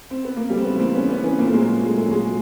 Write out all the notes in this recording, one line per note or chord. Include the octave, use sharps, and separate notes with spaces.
C4
B3
A#3
C#3 G3 A3
C4
A3 B3
E3
A#3 C4
C#3 B3 C#4
B3 C#4
E3
B3 C#4
A#2 A#3 C4
A3
G#3 A#3
F#3
A#2 G#3
A3
F#3
G#3